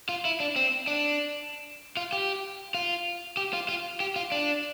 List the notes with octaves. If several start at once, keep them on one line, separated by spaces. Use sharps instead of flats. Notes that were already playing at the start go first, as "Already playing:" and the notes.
F4
E4
D4
C4
D4
F4
G4
F4
G4
F4
F4
G4
F4
D4